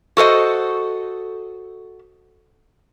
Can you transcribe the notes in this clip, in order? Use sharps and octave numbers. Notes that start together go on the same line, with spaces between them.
F#4 A4 C5 D#5